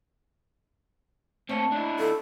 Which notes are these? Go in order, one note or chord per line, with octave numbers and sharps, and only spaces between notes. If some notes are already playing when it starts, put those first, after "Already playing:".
A3 A#3 C4 C#5 A5
D4 E4
D3 F4 A4